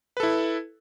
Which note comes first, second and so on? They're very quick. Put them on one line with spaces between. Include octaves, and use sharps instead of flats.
B4 A4 E4